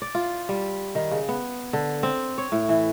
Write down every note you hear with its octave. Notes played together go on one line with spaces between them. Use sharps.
D5
F4
G3
D#3
C#3
B3
D3
C4
C#5
A2
E3